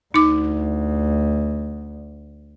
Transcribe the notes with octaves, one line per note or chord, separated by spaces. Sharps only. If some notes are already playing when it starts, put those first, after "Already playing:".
D2 D#4 D6